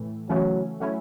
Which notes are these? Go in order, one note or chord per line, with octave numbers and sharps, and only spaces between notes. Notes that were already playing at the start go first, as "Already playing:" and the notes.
Already playing: A2 E3 A3
C#3 E3 F#3 A3 C#4
F#3 A3 C#4 E4